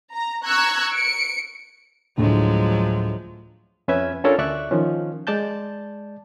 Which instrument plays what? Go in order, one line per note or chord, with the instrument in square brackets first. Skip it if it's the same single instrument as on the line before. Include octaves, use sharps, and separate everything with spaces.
[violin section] A#5
A#5 C#6 E6 F#6 G#6
C#7 D7
[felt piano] D2 A2 [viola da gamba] F3 F#3 G#3
[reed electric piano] F2 C#4 B4 E5 G#6
C#4 D4 F4 A4 A#4 C#5
D2 D5 E5 C#6 F#6
D#3 F3 C#4
G#3 D5 A5 G6